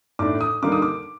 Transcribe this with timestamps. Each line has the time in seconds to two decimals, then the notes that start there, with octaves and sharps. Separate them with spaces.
0.19 A2 A3 D4 D6
0.41 D#6
0.63 D3 G3 A#3 D#4 D6
0.72 D#6
0.82 D6